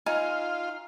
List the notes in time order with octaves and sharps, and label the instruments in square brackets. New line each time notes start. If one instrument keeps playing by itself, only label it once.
[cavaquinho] D#4 G#5 [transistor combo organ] F4